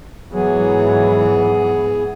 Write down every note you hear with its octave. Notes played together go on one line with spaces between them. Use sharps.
G#2 E3 F#3 B3 G#4